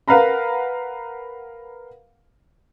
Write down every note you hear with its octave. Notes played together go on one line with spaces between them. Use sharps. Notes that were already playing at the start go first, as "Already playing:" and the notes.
A#4 B4 F5 F#5 A#5 B5